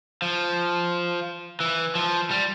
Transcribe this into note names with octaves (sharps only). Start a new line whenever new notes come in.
F3
E3
F3
G3